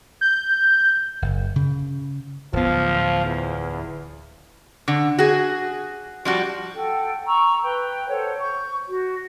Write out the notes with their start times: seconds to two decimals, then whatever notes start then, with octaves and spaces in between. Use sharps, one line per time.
0.21 G6
1.22 F#1
1.56 C#3
2.53 D1 D2 F3 B3
3.25 E2
4.88 D3
5.19 F#4 G#4
6.25 F3 G3 F#4
6.76 A4 F#5 G5
7.26 A#5 C#6 E6
7.63 B4 G5
8.08 A4 C5 C#5 F#5
8.38 C#6 G6
8.89 F#4